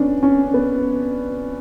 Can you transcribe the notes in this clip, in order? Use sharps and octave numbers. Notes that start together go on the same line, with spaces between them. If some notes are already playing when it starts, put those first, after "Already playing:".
Already playing: B3 C#4 D4
C#4
B3